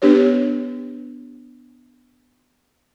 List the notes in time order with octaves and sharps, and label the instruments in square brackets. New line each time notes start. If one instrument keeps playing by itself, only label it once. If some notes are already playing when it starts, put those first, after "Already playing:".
[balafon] B3 D4 G4 B4 C#5